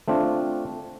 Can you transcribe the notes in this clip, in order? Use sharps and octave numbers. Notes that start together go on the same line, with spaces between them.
A3 C4 D4 F4